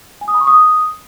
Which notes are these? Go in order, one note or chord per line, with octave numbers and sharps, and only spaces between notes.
G#5
D#6
B5
C#6
D#6